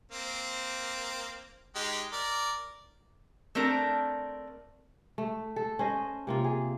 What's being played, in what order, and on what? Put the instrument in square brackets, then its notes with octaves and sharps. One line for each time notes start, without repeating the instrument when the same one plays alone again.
[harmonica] A#3 C4
G#3 D#4 G4
A#4 D5
[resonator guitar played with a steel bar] A3 C4 D4 A#4
[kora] A3
A4
C#4 C5 D#5
C3 A#3 F4
G#4